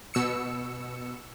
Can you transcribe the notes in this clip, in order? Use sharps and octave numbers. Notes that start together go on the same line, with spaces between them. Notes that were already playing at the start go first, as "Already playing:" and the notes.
B2 E6 C#7